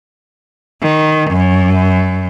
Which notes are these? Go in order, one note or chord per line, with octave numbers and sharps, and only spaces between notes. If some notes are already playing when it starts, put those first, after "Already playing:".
D#3
F#2